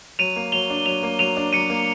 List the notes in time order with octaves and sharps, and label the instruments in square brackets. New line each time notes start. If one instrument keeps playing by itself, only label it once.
[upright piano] F#3 [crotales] D#7 F7
[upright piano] A#3
[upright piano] F#3 [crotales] F7 G7
[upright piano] D4
[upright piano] F#3 [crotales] F7 G7
[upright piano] A#3
[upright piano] F#3 [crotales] D#7 F7
[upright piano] D4
[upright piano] F#3 [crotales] C#7 D#7
[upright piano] A#3